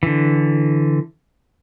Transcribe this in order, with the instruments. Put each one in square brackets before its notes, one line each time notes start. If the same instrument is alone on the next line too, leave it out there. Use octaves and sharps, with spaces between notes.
[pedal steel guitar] D3 E3